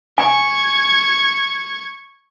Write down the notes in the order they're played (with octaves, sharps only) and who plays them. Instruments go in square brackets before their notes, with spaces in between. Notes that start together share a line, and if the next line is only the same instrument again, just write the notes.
[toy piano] G#5 [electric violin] C#6 G#6